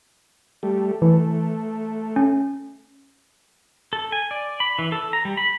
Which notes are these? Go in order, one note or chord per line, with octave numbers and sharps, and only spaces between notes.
G3 A3
E3 A3
C#4
A4
G#5
D5
B5
E3
A4
A#5
G3
B5